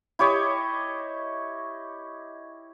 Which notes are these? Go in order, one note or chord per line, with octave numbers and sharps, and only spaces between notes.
E4 G4 C#5 D#5